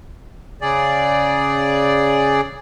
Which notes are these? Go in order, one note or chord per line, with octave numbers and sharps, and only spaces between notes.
C#3 G#4 D5